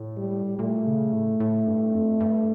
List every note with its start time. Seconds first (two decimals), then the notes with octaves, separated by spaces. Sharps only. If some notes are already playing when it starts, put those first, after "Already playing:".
Already playing: A2
0.17 G3
0.59 A#2 A3
0.86 C#3
1.13 A2
1.40 A2
1.67 G2
1.94 F2
2.20 G2